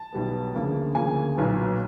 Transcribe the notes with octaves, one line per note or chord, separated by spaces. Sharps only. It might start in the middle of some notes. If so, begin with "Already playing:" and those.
Already playing: A5
B1 B2 G3 B3
D2 C#3 F3 A#3
D2 C#3 F3 A#3 G#5
B1 A#2 F#3 B3